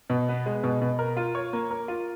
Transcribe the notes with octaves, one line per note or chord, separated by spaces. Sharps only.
B2
B3
G#3
B2
B2
A#4
F4
C#5
A#3
A#4
F4